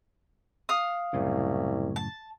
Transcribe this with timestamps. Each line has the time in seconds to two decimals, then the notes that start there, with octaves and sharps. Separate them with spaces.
0.69 F5 D#6
1.14 C2 F#2 A2 C#3
1.96 A5